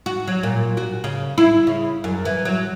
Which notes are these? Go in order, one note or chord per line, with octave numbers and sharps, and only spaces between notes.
F#4
F#3
A#2
F#4
C#3
E4
C#3
F#2
E3
F#3